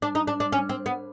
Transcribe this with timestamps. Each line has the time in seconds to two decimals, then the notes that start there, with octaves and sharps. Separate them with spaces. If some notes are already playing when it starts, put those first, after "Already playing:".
0.02 D4
0.15 D#4
0.27 D4
0.40 D4
0.52 C#4
0.69 C4
0.86 B3